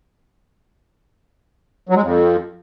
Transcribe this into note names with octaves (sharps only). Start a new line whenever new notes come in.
F#3
G#3
F2